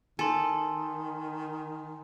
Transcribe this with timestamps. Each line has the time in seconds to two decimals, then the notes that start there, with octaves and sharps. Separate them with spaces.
0.19 D#3 A4 G#5 C6